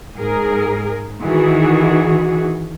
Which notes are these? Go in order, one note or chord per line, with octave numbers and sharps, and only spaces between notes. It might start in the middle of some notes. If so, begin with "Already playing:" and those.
G#2 G#4 A#4
D#3 E3 F#4 G#4